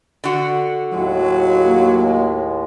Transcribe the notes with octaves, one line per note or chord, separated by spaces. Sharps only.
D3 F#4
D#2 A2 F#3 G#3
A#3